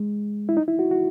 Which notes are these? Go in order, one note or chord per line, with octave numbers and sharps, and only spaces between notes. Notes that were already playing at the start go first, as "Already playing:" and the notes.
Already playing: G#3
E4
D#4
E4
F#4
F#4